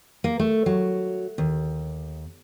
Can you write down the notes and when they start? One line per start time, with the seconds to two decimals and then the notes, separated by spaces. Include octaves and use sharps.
0.24 A#3
0.39 A3
0.66 F#3
1.38 D#2